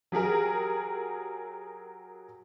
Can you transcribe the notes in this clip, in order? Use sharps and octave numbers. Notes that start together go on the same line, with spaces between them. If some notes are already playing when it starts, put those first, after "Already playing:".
F#3 G4 G#4 A#4